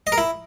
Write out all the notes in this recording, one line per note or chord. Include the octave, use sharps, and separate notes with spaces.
D#5
A#4
E4